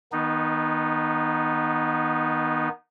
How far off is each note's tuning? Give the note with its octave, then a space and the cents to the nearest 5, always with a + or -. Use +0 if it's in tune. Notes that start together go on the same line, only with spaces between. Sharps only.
D#3 +20 B3 -20 D#4 -10